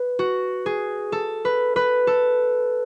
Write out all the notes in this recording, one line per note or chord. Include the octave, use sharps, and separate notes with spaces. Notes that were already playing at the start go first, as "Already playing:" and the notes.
Already playing: B4
F#4
G#4
A4
B4
B4
A4